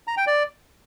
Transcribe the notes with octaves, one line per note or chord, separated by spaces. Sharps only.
A#5
G5
D5